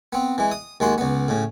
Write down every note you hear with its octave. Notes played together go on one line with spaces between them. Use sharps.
B3 C4
E3 G#3
D#6
D#2 G#3 F#4 C6
C#2 B3
A2 C#3